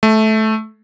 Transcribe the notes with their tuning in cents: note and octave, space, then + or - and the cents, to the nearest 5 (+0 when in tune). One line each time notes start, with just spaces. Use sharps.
A3 -15